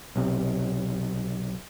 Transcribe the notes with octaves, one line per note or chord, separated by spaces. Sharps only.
B1 C3